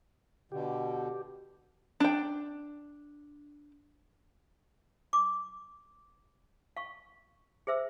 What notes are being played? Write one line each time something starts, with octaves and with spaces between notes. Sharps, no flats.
B2 D3 G4
D4 G5
D6
F5 C#6
G#4 C5 E5 E6